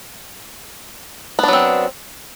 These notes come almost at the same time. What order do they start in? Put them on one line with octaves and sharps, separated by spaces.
B3 D4 F#3 C4